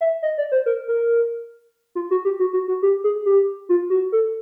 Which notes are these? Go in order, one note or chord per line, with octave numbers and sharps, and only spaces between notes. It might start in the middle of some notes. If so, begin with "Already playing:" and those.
E5
D#5
D5
C5
A#4
A#4
F4
F#4
G4
F#4
F#4
F#4
G4
G#4
G4
F4
F#4
A4